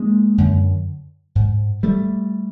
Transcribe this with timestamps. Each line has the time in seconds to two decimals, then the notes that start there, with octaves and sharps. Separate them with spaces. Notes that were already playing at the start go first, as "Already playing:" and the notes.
Already playing: G#3 A#3
0.38 F#2 D3
1.35 G#2
1.83 G3 A3